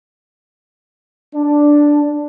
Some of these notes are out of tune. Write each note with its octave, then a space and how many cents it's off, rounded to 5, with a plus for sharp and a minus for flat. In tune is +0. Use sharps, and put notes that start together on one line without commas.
D4 +0